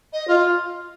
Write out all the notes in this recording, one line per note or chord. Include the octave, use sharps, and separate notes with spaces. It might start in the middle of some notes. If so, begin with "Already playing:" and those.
D#5
F4